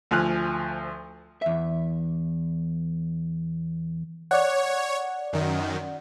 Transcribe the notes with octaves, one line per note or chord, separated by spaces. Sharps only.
D2 F3 G#5 F6 F#6
E2 E5
C#5 D5 F#5
F#2 D#3